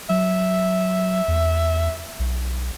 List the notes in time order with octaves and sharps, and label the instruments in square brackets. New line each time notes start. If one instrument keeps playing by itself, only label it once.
[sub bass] F#3 [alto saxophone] E5
[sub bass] E2
B1